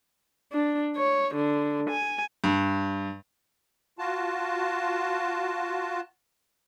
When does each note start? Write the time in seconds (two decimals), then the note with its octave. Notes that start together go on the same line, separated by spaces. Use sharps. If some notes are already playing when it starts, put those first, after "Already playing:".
0.53 D4
0.97 C#5
1.36 D3
1.91 G#5
2.44 G2
3.99 F4 F#4 A5